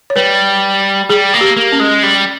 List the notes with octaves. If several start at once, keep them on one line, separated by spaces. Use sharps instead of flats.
C#5
G3 B4
G3 G#4
A#3
G4
A#3
C#4
G#3
G3